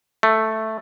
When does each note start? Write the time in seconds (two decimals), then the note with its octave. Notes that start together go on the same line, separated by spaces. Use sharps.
0.23 A3